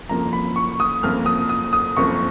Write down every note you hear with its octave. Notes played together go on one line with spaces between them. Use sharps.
F#1 F2 F3 A#3 A#5
B5
C#6
D#6
F#1 F2 F3 A#3 F6
D#6
D#6
D#6
F#1 F2 F3 A#3 C#6